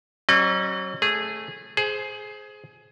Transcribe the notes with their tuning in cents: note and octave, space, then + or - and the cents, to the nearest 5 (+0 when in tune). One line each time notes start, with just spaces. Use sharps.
F#3 +30 C#4 -35 D#5 -45
A3 +0 G#4 -15
G#4 +15 C5 +0